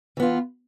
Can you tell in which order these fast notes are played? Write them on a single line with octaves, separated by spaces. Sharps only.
E3 B3 F4